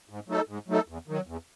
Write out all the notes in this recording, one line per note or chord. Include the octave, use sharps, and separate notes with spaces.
G#2
F#3 A3 D#4 A4
G#2
F#3 A3 D#4 A4
E2
D#3 F#3
E2